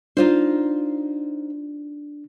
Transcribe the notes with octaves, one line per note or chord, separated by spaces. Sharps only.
D4 D#4 F4 C5